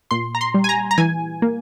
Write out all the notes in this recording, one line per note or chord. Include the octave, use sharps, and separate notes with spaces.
A#2 C6
A#5
C6
G3
G#5
A#5
A#5
E3 G#5
A#3